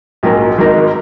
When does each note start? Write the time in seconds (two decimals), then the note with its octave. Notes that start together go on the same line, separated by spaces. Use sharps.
0.23 A#1 G#2 F#3 C#4 A#4
0.58 G#1 G#2 F#3 D#4 A#4